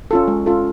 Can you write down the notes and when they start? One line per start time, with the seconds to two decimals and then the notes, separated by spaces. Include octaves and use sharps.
0.11 C#4 F4 A4
0.28 G#3
0.46 C#4 F4 A4